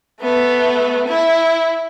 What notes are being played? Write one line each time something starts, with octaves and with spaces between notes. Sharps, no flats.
A3 B3
E4